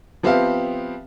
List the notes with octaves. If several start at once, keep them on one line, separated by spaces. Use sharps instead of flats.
F3 B3 C4 G4 E5 F5